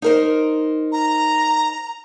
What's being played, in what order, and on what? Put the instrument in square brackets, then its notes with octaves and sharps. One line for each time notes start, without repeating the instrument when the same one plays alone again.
[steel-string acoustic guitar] D#4 A#4 C5
[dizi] A#5